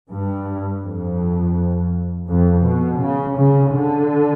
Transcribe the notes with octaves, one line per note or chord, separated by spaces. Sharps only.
G2
F2
F2
B2
C#3
C#3
D3